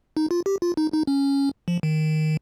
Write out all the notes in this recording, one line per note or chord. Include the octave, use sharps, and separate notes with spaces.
D#4
F4
G4
F4
D#4
D#4
C#4
F3
D#3